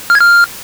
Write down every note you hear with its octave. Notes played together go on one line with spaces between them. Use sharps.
F6
G#6
F6